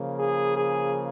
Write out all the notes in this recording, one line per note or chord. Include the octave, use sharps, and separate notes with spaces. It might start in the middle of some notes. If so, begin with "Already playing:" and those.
Already playing: C#3 F3 A#3
G#4
G#4